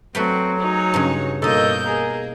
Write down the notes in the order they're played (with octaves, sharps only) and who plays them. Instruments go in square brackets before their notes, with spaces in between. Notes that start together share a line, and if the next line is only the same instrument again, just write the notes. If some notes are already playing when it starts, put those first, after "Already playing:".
[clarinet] F#3 [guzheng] A3 B4 G5 [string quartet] C4 [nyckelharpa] F#4
[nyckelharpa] D#4 [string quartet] F#4 G#4 C#5
[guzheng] G2 C#3
[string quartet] G2 A#3 G6 [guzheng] B2 D#4 [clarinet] A4 [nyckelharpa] D#5
[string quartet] A#3 [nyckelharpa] G#4 [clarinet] A#5